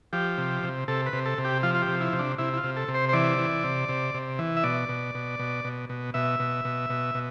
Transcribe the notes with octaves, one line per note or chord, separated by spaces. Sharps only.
F3 G4
C3
C3
C3 A4
B4
C3
A4
C3
G4
F3 F4
F4
G4
C3
E4
C3
D4
C3 E4
E4
F4
C3
A4
C3
C5
C5
E3 D5
E3
C3
C3
C3
E3
E5
B2 D5
B2
B2
B2
B2
B2
B2 E5
B2
B2
B2
B2